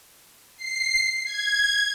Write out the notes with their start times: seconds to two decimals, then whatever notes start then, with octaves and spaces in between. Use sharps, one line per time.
0.57 C7
1.25 G#6